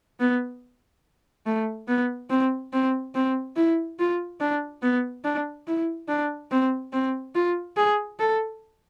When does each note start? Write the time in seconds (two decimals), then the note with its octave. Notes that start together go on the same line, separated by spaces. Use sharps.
0.20 B3
1.46 A3
1.88 B3
2.30 C4
2.73 C4
3.15 C4
3.57 E4
3.99 F4
4.40 D4
4.82 B3
5.25 D4
5.67 E4
6.08 D4
6.51 C4
6.93 C4
7.35 F4
7.77 G#4
8.19 A4